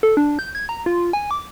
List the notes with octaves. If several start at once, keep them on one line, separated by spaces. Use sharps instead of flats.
A4
D4
G6
G#6
A#5
F4
G#5
D6